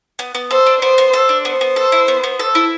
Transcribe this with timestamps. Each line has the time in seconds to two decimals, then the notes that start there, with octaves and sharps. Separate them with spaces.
0.19 B3
0.35 B3
0.51 A4 C5
0.66 D4
0.82 B3 C5
0.98 B3
1.13 A4
1.29 D4
1.44 B3 C5
1.61 B3
1.76 A4
1.92 E4
2.08 B3
2.24 B3
2.39 A4
2.55 E4